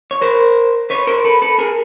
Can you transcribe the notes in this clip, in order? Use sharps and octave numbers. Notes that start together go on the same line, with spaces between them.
C#5
A#4 C5
B4 C#5
A#4 C5
A4 B4
A4 B4
G#4 A#4